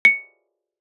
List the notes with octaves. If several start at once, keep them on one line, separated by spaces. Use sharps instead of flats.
C#7